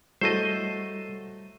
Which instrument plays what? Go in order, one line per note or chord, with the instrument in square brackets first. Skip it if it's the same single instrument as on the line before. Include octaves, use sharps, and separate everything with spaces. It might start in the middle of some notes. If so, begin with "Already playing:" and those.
[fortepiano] F#3 A3 A4 [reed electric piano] G3 [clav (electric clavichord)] C5 D#5